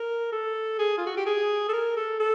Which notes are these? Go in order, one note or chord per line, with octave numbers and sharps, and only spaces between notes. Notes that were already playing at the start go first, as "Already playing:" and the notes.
Already playing: A#4
A4
G#4
F4
F#4
G4
G#4
A4
A#4
A4
A4